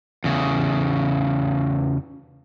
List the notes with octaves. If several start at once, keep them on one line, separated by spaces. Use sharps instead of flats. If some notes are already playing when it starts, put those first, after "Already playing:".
E2 C#3